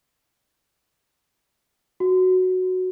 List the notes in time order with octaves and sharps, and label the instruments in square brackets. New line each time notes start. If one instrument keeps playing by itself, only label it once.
[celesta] F#4